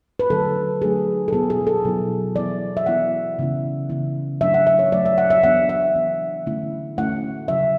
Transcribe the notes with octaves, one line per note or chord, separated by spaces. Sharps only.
B4
D3 F#3 A3 D4 A4
D3 F#3 A3 D4 G#4
A4
B2 F#3 B3 E4 G#4
G#4
A4
B2 F#3 B3 E4
E3 B3 E4 D5
E5
E3 B3 E4 F#5
C#3 E3 B3 E4
C#3 E3 B3 E4
F#3 A3 D4 E5
F#5
E5
C#5
F#3 A3 D4 D5
E5
F#5
E5
E3 B3 D4 F#5
E5
E3 B3 D4
D3 A3 C#4 E4
D3 A3 C#4 E4 F#5
C#3 F#3 C#4 E5